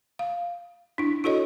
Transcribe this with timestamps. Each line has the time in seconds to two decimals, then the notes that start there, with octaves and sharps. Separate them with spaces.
0.19 F5
0.98 D4 E4
1.24 E4 F#4 A4 C#5 D#5